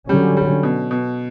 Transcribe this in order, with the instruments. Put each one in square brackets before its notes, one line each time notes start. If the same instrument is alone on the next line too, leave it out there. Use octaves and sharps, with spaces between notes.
[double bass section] D3 F#3 C#4 [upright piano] G3
[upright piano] G3
B2
B2